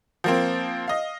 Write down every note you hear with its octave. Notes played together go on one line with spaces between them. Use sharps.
F3 A#3 C4
D#5 F5